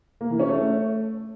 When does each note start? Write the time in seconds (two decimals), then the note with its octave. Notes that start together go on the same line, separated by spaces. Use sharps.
0.21 A#3
0.30 E3
0.40 C#4
0.49 A3